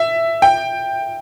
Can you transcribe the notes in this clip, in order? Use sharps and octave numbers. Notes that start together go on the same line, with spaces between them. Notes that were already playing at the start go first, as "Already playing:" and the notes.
Already playing: E5
G5